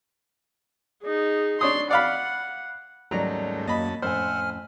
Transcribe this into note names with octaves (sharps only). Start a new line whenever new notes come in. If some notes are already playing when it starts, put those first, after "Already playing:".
D#4 G#4
D4 C#5 C6 D#6
D5 F5 F#5 B5
D#2 G#2 F#3 G3 A3 C#4 D5 A#5
F#2 A#3 D#5 A5 B5
F2 A2 C#4 C5 E5 F#5 G#5 F6